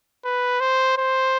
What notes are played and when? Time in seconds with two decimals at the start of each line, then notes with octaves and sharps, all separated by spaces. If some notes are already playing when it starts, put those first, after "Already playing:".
0.25 B4
0.60 C5
0.97 C5